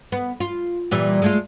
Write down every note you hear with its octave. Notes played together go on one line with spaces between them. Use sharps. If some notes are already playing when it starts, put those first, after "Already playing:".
B3
F4
A#2 E3 G3
G#3 A3 F4